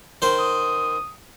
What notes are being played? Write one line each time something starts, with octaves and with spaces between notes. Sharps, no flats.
D#3 C5
D#6